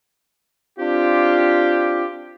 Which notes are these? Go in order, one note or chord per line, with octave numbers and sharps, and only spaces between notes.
C4 D4 F4 G4